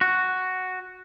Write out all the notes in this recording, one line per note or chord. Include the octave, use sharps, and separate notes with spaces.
F#4